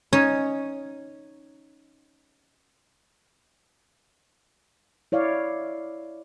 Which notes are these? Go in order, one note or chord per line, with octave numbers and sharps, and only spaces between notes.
C#4 D#4 C#5
E4 C#5 D5 F5